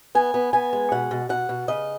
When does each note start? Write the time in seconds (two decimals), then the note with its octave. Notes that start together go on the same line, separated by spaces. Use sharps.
0.15 B3 G#5
0.34 B3
0.53 B3 G#5
0.73 G#3
0.92 B2 F#5
1.11 B2
1.29 B2 F#5
1.49 B2
1.68 C#3 D#5